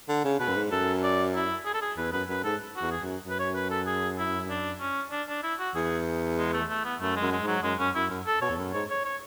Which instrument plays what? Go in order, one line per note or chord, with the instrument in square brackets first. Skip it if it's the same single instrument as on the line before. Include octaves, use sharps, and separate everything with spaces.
[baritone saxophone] D3
C#3
[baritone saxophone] B2 [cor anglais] B4
[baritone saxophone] F#2
G#2
[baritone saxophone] F#2 [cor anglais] A4
[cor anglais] D5
E4
G#4
A4
G#4
[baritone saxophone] E2 [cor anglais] B4
[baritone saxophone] F#2 [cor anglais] B4
[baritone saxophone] F#2 [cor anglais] B4
[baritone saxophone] G#2 [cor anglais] A4
[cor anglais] F#4
[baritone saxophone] E2
[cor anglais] G#4
[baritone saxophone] F#2
F#2
[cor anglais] B4
C#5
B4
A4
G#4
E4
D4
C#4
D4
D4
E4
F#4
[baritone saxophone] E2 [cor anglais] G#4
[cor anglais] G#3
A3
A3
B3
[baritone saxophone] F#2 [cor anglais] A3
[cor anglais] G#3
[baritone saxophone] F#2
[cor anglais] G#3
[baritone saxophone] G#2
[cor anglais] F#3
[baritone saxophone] F#2 [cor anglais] G#3
[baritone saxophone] F#2 [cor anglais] C#4
[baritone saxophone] F#2 [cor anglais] E4
[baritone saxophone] F#2
[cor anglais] A4
[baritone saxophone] B2 [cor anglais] C#5
[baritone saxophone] E2
F#2
[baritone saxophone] G#2 [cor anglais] C#5
[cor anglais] C#5
C#5